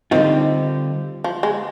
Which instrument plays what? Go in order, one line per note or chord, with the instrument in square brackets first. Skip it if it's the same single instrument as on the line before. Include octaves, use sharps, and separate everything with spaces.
[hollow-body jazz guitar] D3 G3 C4 F4 [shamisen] D#3
[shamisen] F3
G#3